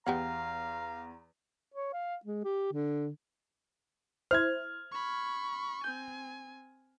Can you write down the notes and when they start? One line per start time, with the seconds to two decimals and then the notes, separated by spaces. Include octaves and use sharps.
0.06 E2 B3 G4 F5 F#5 A#5
1.74 C#5
1.93 F5
2.25 G#3
2.44 G4
2.73 D3
4.31 E4 C5 F6 G#6
4.91 B5 C#6
5.84 C4 G#5 G6